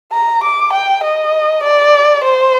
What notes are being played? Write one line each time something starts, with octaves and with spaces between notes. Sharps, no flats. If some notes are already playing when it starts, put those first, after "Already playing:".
A#5
D6
G5
D#5
D5
C5